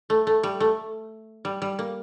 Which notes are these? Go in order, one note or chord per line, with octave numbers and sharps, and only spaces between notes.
A3
A3
G3
A3
G3
G3
A#3